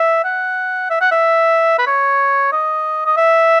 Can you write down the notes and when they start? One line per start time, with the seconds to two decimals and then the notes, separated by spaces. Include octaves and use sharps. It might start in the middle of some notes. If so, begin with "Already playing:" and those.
Already playing: E5
0.25 F#5
0.90 E5
1.01 F#5
1.12 E5
1.79 B4
1.87 C#5
2.52 D#5
3.06 D#5
3.17 E5